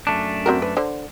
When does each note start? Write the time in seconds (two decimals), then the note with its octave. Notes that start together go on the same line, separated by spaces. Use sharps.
0.07 F#2 A3 D4
0.46 C4 F#4 A#4
0.62 B4
0.77 D3 C5